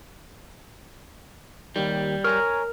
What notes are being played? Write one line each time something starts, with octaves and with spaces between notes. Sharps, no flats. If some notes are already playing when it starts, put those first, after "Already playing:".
D#2 D#3 G3
A#4 C#5 G#5 A#5 F6